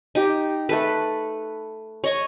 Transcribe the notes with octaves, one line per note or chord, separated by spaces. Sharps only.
D#4 G4
A3 A4 B4
C#5 D#5 C#6